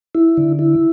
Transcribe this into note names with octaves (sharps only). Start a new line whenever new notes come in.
E4
D3
E4